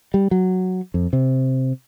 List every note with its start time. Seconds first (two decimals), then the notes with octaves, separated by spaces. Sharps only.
0.14 G3
0.31 F#3
0.94 F2
1.13 C3